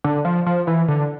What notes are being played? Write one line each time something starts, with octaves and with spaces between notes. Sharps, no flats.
D3
F3
F3
E3
D3